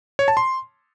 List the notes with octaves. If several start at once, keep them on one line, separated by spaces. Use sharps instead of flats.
C#5
A5
C6